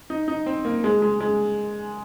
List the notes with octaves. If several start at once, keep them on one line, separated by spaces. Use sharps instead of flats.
D#4
D#4
C4
A#3
G#3
G#3
G#3